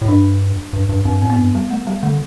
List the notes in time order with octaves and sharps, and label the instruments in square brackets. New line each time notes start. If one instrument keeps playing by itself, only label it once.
[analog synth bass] A2
[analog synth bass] G2 [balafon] D4
[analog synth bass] G2
G2
[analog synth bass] G2 [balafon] C4
[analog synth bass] A2 [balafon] C4
[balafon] B3
[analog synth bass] G2
[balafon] G3
A3
G3
[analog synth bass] D3 [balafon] A3